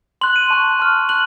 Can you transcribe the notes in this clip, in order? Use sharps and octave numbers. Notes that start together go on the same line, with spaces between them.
C6 F#6 F#7
D#7
A5 C#6 F#6
A5 C#6 F6
F#6 F#7